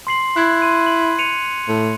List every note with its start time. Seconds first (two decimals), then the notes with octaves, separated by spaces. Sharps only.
0.07 C6 C7 F#7
0.36 E4 F#6 G#6
0.62 C6 D#7
0.86 F#7
1.18 C#7 D#7 F7
1.69 A2